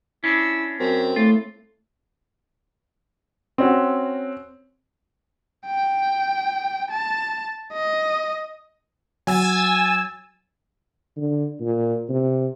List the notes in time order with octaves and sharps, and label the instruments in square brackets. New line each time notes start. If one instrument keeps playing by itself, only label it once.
[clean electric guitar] C#4 D4 [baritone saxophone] E4
[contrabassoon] F#2 [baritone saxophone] C4
[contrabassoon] A2 [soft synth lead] A3 [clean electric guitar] F4
[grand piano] C4 C#4 F#4
[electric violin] G5
A5
D#5
[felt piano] F#3 [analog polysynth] G#5 E6 A6
[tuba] D3
A#2
C3